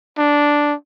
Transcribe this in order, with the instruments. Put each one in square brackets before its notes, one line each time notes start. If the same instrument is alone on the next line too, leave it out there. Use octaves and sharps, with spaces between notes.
[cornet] D4